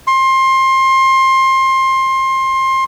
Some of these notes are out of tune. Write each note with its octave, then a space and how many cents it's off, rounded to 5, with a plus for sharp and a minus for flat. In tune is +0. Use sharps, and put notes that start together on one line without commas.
C6 +25